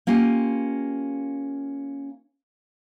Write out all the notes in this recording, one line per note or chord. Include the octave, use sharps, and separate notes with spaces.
A#3 C#4 F4 G4